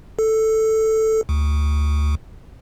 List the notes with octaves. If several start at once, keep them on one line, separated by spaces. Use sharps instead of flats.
A4
D2